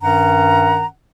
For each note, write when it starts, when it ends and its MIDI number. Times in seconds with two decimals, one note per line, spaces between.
0.01 0.85 43
0.01 0.85 51
0.01 0.85 61
0.01 0.85 78
0.01 0.85 82